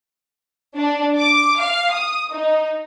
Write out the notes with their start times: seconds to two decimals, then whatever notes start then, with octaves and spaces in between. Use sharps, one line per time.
0.75 D4
1.18 D6
1.59 F5
1.92 D#6
2.32 D#4